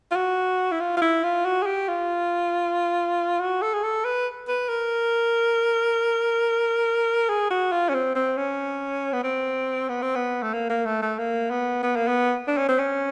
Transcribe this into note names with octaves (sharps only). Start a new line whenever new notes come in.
F4
F#4
E4
F4
F4
E4
F4
F#4
G#4
G4
F4
F#4
A4
G#4
A4
B4
B4
A#4
G#4
F#4
F4
C#4
C4
C4
C#4
B3
C4
B3
C4
B3
A3
A#3
A#3
A3
A3
A#3
B3
B3
A#3
B3
D4
C#4
C4
C#4